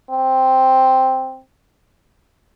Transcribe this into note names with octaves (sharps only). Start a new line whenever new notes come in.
C4